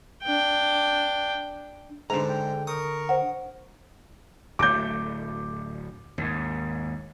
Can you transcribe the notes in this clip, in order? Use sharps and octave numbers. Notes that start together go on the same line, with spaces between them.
D4 G5
G#2 D3 A#5
G5
A#4 C#6 D#6
C5 F#5
D1 A3 D6 G6
D#2 G#2